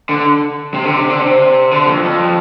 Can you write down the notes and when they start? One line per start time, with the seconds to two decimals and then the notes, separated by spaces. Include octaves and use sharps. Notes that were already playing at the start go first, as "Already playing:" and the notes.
0.09 D3
0.74 C3
0.85 D3
0.97 C3
1.10 D3
1.22 C3
1.71 D3
1.87 F2
2.03 F2